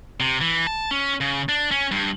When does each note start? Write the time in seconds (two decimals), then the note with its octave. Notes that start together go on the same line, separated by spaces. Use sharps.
0.20 C3
0.41 E3
0.67 A5
0.91 C#4
1.21 C#3
1.49 D4
1.71 C#4
1.91 G2